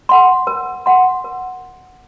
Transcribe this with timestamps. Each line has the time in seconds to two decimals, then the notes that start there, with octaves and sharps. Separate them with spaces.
0.09 F#5 C6
0.47 A#4
0.86 F#5 C6
1.24 A#4